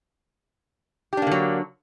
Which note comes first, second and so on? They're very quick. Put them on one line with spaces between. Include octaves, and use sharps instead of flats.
G4 D4 A#3 D3 F#3